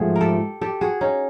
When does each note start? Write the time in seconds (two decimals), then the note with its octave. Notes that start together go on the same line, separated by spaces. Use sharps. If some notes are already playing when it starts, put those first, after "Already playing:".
Already playing: G#2 F3 A3 F#4 G#4
0.16 A#4
0.21 G4 A4
0.61 G4 A4
0.81 F#4 G#4
1.01 C#4 D#4